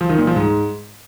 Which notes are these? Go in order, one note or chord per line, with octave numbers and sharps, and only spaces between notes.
F3
D#3
A#2
F3
G#2